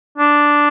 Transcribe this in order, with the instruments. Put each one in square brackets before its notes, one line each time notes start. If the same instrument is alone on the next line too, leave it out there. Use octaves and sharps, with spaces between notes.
[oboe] D4